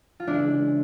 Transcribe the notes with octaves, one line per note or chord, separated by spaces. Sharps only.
F4
C#3 E3 G#3 D4 E4